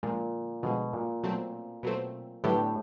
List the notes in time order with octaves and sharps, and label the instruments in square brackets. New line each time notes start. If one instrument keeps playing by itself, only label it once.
[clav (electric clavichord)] A#2 [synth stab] D3 F3 G#3
[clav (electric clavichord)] B2 [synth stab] D3 F3 G#3
[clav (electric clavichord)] A#2
[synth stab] B2 F#3 A3 C4
B2 F#3 A3 C4
[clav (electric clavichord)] A2 [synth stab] D3 F#3 B3 D4 G4